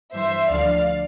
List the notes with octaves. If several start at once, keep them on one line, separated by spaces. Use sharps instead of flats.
G2 E3 C5 E5
D2 D3 F3 D5 F5